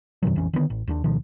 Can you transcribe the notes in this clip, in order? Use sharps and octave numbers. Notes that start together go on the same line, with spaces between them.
F2 B2 D#3 F#3
A#1 F2 E3 C#4
D3 D#3 G3 B3
A1
D#2 A#3 D4
D2 B2 D#3 F3